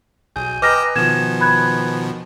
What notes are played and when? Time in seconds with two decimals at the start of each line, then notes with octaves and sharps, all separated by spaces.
0.36 B1 G#4 G#5 G6
0.62 B4 D#5 G5 G#5 A#5 D6 F6 A#6
0.95 B2 D#3 F3 G#6 E7
1.41 B5 F#6 G#6